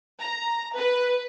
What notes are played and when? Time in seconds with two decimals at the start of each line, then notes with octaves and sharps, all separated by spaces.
0.22 A#5
0.77 B4